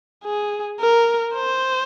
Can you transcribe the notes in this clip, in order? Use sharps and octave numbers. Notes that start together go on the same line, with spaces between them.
G#4
A#4
C5